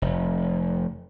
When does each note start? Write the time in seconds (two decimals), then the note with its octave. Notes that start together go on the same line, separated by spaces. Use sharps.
0.02 F1